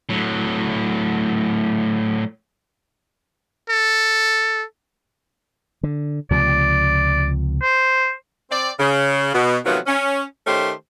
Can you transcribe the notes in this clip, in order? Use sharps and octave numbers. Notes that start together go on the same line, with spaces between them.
A2 F#3
A4
D3
C#2 C3 F3 D5
C5
C4 D5
C#3
B2
C3 D#3 F3 F#3 A3 B3
C#4
D#3 A3 C#4 D#4 G4 C5